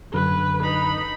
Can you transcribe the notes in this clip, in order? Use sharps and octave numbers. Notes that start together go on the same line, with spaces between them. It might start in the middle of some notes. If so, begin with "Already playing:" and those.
F#2 D3 B4
D#4 B5